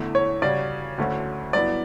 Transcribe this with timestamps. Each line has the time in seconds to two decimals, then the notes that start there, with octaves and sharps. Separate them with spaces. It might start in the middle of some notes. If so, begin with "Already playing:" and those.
Already playing: E2 D3 A3 E4
0.15 C#5
0.42 C#3 G3 C#4 F#4 D5
0.98 D2 D3 A3 C#4 F#4
1.53 G2 F#3 B3 E4 D5